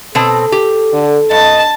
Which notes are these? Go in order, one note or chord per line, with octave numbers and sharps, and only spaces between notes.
B2 C4 A4 A5
G4
D3
G2 D#5 A5